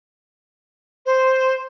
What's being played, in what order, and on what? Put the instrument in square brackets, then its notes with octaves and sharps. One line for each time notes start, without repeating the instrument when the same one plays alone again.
[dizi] C5